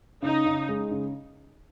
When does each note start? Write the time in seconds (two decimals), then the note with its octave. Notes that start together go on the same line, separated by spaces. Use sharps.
0.22 C#3 D#4
0.46 C#3
0.69 G#3
0.91 C#3